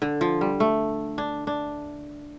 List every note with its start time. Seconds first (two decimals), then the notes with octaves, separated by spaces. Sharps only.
0.02 D3
0.21 F3
0.41 G3
0.60 A3
1.18 D4
1.47 D4